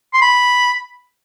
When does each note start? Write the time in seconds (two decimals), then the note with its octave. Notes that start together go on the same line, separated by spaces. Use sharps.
0.14 C6
0.21 B5